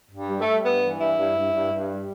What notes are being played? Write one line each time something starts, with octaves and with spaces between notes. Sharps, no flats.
G2
G3
A3
G3
G2 B3
E3
G2 E4
G2
G2
G2
G2
G3